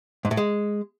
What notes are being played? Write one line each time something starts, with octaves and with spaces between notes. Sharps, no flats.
G#2
A2
G#3